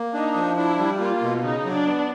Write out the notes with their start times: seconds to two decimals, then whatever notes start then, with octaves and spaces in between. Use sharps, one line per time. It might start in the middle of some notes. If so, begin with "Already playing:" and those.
Already playing: A#3
0.14 D4 D#4
0.36 F3
0.56 D4 E4
0.78 G3
1.00 A#3 F4
1.22 B2
1.43 C#3 D#4
1.65 F#3
1.72 D4
1.86 B3